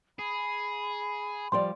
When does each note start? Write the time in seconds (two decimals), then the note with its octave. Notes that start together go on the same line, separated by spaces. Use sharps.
0.19 G#4 B5
1.52 F3 G3 D5 C6